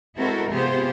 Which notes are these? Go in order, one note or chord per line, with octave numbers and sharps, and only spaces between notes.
G#3 C4 E4 F#4 A4 A#4
C3 B3 F4 G4 G#4 C5